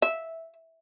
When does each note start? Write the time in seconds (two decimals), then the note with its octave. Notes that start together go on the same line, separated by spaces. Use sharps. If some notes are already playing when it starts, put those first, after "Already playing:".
0.02 E5